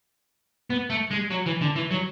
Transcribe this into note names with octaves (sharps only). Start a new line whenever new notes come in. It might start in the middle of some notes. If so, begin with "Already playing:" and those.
B3
A3
G#3
F#3
E3
D3
E3
F#3